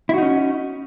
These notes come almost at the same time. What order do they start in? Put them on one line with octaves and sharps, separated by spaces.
E4 F#4 D#4 C#4